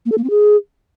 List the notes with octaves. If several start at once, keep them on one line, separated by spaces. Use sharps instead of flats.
A#3
A4
A#3
C4
G#4